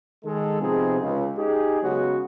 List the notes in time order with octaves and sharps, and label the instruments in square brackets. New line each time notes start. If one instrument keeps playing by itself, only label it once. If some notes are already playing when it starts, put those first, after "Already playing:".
[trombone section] D#3 G#3 A4
C3 F3 B3 C4 D#4 G#4
C#2
D#4 G4 G#4
C#3 F#3 G#3 B3 C#4 F#4